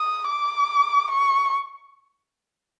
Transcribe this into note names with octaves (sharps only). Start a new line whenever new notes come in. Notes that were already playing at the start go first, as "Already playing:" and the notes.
Already playing: D#6
D6
C#6